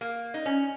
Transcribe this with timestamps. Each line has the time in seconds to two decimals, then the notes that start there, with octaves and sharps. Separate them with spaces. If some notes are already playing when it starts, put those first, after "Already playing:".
0.01 A#3
0.34 D#4
0.46 C#4